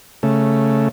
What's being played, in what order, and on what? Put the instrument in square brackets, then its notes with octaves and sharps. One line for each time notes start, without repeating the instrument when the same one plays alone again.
[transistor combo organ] C#3 A3